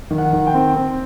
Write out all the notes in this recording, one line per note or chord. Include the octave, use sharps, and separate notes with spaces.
D#3
F#5
D#3
G5
C4
C4